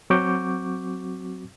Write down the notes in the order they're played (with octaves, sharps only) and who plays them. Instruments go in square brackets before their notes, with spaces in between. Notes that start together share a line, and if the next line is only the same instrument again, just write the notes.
[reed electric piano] F#3 C4 F#4 C#6 D6 G6